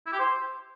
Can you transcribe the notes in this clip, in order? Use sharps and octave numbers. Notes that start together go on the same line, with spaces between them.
E4
G4
C5